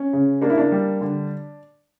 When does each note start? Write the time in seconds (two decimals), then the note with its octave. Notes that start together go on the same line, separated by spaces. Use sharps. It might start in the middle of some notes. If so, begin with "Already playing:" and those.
Already playing: C#4
0.13 C#3
0.42 A#3 D4
0.50 E4
0.58 D4
0.72 G3
1.01 D3